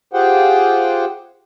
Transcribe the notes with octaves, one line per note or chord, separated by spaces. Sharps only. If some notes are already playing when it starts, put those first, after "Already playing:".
F4 G4 G#4 C5 F#5 G5